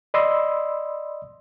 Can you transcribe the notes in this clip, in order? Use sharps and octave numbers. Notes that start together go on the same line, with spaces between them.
D5 D#5 B5 C6 D#6 E6